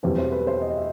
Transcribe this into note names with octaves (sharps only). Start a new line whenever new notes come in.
E2 B2 G3 C4 B4
C5
B4
C5
D#5
E5